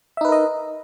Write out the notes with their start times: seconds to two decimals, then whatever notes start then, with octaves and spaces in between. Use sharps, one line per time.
0.17 E5
0.21 D#4
0.25 B4
0.28 A#4
0.32 D#5